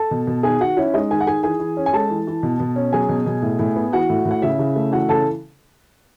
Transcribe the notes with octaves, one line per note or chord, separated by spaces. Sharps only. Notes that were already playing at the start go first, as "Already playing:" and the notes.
Already playing: A4 A5
B2
B2
D#3 G#4 G#5
D#3 F#4 F#5
C#4 E4 E5
G#3 D#4 D#5
D#3 G#4 G#5
F#5
D#3 G#4 G#5
E3 G#4 G#5
E3
C#4
G#5
G#3 A4 A5
E3
E3
B2
B2
C#4
F#3 G#4 G#5
B2
B2
A2
A2
B3
E3 F#4 F#5
A2
A2
F#5
C#3 E4 E5
C#3
A3
E3 F#4 F#5
C#3 A4 A5